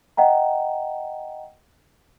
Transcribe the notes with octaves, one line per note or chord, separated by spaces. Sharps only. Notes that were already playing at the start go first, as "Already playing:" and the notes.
D#5 F#5 G5 A#5